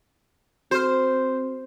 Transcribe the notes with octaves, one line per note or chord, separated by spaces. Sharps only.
C4 F#4 A4 C5 F6